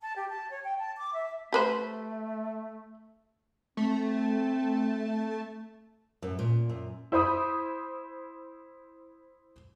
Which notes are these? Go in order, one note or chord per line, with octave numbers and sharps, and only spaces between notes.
A5
G4
A5
C#5
G5
A5
D6
E5
A3 G4 B4 C5
A3 C4
F#2
A#2
F#2
E4 C5 B5 D#6